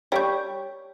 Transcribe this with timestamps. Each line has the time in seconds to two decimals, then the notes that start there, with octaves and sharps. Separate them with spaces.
0.12 G3 C#5 G5 C#6 G6